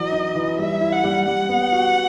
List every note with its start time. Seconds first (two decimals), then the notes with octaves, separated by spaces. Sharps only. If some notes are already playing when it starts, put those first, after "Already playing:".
Already playing: E3 F#3 D#5
0.12 D#4
0.35 E3
0.58 G3 E5
0.81 E4
0.93 F#5
1.04 G3
1.27 G3 F#5
1.49 B3
1.72 F#4